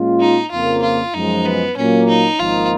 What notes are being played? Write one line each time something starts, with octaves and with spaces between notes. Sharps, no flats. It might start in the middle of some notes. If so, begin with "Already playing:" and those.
Already playing: A#2 G#3 C#4 F4
D#4
F2 C#3 F3 A#3 F4
F4
F#2 F3 G#3 D#4
B3
A#2 F#3 A#3 C#4
D#4
G#1 G#2 F3 A#3 D#4 F4